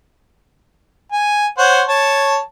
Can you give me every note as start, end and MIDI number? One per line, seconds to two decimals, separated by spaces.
1.12 1.47 80
1.58 1.82 72
1.58 1.82 73
1.58 1.82 78
1.88 2.38 73
1.88 2.38 81